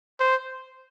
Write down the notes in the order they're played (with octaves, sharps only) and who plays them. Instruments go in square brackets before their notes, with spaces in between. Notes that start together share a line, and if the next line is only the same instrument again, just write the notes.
[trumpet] C5